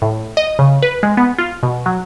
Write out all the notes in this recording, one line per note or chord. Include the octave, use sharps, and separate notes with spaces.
A2
D#5
C#3
B4
G#3
B3
F4
B2
F#3